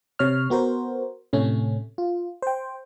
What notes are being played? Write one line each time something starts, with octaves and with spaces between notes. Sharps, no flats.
C3 C#5 F6
B3 F#4 A#4 C5
A2 C3 A3 C#4
F4
C5 G5